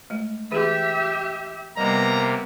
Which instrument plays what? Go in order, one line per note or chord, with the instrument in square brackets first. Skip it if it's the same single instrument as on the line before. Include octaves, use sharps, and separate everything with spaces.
[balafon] G#3 A3
[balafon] E3 G#4 [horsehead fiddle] G4 E5
[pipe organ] C3 A#3 [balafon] G3 [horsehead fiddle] B3 [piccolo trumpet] A#5